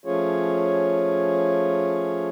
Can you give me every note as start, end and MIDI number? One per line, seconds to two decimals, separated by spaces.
0.05 2.29 53
0.05 2.29 57
0.05 2.29 61
0.05 2.29 65
0.05 2.29 68
0.05 2.29 73